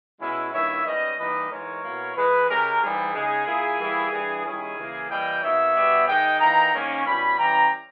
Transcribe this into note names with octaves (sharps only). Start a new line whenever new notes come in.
B2 G#3 C#4 E4
G2 D#3 A#3 E4 C#5 E5
G#2 G3 C#4 B4 D#5
E3 G3 A#3 D#4 B4 D#5
G#2 E3 G#3 A#4 C#5
B2 A#3 E4
E3 G#3 D#4 G#4 B4
C#3 G#3 C#4 G4 A#4
G#2 E3 G3 G#4
C#3 G#3 D#4 G#4
A#2 A#3 E4
E3 G3 A#3 E4
G2 E3 G3
D#3 G3 C#4 E4 G#4
C#3 E3 A#3 E4
E3 G3 A#3 E4 D#5 G5
B2 A#3 D#4 C#5 E5
B2 G3 B3
D#3 G#3 D#4 D#5 G5
E3 A#3 D#4 G5 A#5
G#2 D#3 A#3 C#4
B2 G3 C#4 E4 G#5 B5
E3 G3 C#4 G5 A#5